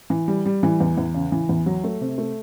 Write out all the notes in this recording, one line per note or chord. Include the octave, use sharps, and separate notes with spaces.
E3
G3
G3
E3
E2
E2
C#3
E3
E2
F#3
A3
C3
A3